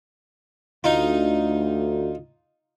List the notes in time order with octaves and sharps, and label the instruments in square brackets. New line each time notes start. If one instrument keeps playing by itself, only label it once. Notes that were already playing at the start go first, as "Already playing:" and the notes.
[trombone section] D2 [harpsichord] D#4 F4